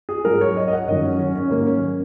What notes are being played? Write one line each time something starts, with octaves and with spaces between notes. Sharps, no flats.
G#4
G#2 F#3 A#4
C#5
D#5
D#5
F#5
F#2 D#3 F#3 D#5
C#4
C#4
C#4
G#2 D#3 F#3 A#3
C#4